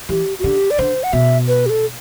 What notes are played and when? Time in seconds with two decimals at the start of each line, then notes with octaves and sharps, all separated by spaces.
0.09 E3 G4
0.39 F#4
0.44 D3 G4
0.71 D5
0.78 D3 C5
1.03 F#5
1.13 B2 E5
1.48 B4
1.66 G4
1.70 A4